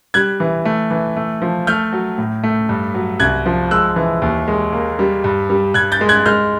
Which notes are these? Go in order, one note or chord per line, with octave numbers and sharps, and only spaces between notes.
G3 F#6 G#6
E3
A3
E3
A3
F3
A3 F6 G6
F#3
A2
A3
G2
F#3
C2 F#6 G#6
F3
G#3 E6 F#6
E3
D#2
G#3
A#3
G3
G2
G3
G2 F#6 G#6
G6 A6
G#3
F#6 G#6
G#3 F6 G6